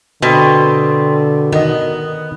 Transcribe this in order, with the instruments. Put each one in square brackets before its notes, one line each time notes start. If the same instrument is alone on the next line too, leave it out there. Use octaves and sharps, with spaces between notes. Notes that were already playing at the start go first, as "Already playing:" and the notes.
[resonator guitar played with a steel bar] B2 [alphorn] D3 [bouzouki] C4
[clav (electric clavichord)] D#3 D#5 [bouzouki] B3